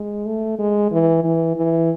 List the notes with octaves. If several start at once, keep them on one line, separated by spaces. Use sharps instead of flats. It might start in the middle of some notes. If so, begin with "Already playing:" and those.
Already playing: G#3
A3
G#3
E3
E3
E3